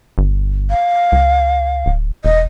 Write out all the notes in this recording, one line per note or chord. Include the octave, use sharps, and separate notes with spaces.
G1
F5
C#2
D1
E1 D#5